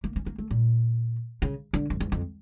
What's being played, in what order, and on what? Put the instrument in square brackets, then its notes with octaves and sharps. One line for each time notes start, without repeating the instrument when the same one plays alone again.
[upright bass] A#3
C#4
A#3
A3
A#2
C#3
D3
F2
E2
F2